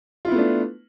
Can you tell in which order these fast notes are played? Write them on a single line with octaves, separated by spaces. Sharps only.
F4 E4 B3 A3 D4